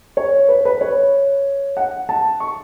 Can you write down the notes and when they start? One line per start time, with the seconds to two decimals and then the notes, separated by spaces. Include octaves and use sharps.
0.17 C#5
0.49 B4
0.65 B4
0.81 C#5
1.77 F#5
2.09 A5
2.40 C#6